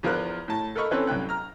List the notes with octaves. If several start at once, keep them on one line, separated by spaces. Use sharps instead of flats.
E2 F3 F4 A#4 F#6
A2 A5
A4 A#4 D#5 B5 C#6 F6
E3 C4 C#4 A4 B4 C#5
C2 F#2 G5 F#6
A#5 F6